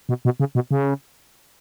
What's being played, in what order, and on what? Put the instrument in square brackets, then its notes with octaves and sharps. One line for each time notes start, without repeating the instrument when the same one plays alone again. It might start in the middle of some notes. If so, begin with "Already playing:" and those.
[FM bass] B2
B2
C#3
B2
C#3